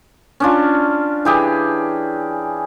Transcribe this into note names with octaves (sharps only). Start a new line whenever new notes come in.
C#4 D4 F4
E3 G4 G#4